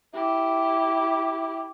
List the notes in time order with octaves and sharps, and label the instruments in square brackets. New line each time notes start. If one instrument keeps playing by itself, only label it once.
[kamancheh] E4 G4